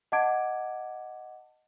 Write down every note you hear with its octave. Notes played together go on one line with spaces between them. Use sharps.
D#5 F#5 A5 D6 G#6 D7